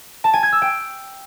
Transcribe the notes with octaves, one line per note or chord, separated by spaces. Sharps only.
A5
G#5
G#6
E6
G5